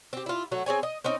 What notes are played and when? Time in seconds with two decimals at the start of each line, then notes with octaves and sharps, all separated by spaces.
0.13 C4 G4
0.26 E4 F4
0.51 F#3 A3 F#4
0.66 C4 G#4 C#5 G#5
0.83 D#5
1.04 C4 C#4 D#4